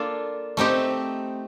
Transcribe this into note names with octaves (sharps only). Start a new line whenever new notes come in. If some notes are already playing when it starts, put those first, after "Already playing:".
Already playing: A#3 D4 F4 A4
A3 C4 D#4 G4